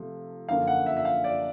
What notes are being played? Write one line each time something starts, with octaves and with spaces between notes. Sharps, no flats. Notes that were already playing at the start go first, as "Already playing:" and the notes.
Already playing: C3 F3 A3
F#2 D3 F3 A#3 F5
F#5
E5
E5
F5
D5